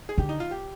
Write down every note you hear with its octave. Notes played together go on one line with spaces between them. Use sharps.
G#4
D3 G4
D#4
F4
G4